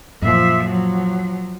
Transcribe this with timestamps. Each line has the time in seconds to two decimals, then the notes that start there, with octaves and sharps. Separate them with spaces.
0.22 F#2 A#2 F3 E5
0.65 F3 F#3